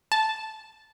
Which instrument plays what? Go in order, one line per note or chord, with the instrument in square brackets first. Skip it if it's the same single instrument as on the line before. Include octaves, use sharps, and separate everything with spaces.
[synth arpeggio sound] A5